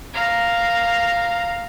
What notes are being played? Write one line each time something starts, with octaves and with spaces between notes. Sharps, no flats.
F5 A#5